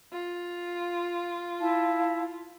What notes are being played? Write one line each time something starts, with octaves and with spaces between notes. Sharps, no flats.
F4
E4 F5 A5